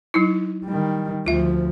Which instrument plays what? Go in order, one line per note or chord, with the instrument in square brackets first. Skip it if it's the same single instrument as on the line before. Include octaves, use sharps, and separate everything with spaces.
[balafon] F#3 D#4 E4
[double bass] D#3 G3
[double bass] D2 F3 [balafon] F4 E5